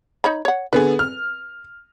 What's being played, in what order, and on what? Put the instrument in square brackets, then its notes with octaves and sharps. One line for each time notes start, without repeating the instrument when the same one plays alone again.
[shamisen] D#4 C#5 B5
C#5 F#5
[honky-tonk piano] D3 B3 G#4 [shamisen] B4
[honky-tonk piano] F6